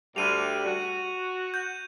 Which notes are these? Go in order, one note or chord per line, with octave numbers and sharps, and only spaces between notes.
D2 G3 D#7 F7
F#4
G6